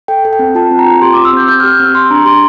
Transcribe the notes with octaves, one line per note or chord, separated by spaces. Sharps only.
A4 G5
A4
G5
C4
F4 A5
C4
A#5
F4
G4 C6
C4 D6
E6
C4 G6
G4 G6
G4 F6
G6
C4 E6
G4 C6
D4 A#5
G4 C6